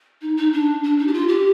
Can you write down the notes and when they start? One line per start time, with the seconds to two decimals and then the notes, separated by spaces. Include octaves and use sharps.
0.22 D#4
0.37 D#4
0.53 D4
0.83 D4
0.99 D#4
1.07 G4
1.14 F4
1.28 G4